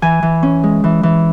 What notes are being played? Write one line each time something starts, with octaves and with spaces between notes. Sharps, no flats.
E3 G#5
E3
C#4
G#3
E3
E3